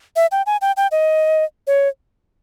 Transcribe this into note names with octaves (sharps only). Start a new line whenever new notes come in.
E5
G5
G#5
G5
G5
D#5
C#5